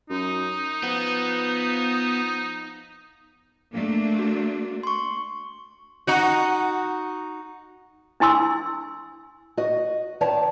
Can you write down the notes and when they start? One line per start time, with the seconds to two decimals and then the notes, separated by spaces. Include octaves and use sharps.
0.10 F#2 D#4
0.83 F3 B3
3.73 A3 A#3 D4
4.19 F#4
4.83 C6 C#6
6.07 D#4 F#4
8.20 D4 E4 G#5 C6 E6
9.57 F#4 D#5
10.21 D#3 C#5 D5 A5